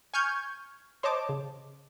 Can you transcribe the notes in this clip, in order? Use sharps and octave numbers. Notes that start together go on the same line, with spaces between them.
G#5 C#6 F6 G6 G#6
C5 C#5 D#5 A5 D6
C#3